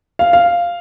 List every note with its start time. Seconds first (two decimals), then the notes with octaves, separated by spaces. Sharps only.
0.19 F5
0.33 F5